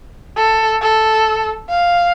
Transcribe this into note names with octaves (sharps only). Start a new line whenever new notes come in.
A4
A4
F5